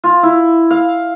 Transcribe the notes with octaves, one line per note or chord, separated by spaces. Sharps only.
F4
E4
F5